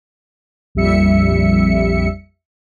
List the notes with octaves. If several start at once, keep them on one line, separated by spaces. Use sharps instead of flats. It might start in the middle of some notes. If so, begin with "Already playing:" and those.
A#1 F2 G3 E5 C#7